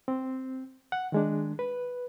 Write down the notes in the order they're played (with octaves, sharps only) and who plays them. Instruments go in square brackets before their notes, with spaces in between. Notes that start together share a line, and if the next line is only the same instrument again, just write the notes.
[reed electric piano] C4
F#5
D#3 G#3 D4
B4